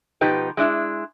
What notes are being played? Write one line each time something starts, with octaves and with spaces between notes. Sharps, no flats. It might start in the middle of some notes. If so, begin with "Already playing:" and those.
B2 F3 D#4 G4 B4
G#3 D4 E4